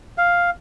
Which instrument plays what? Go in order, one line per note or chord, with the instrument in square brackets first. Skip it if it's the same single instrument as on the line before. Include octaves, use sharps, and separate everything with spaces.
[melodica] F5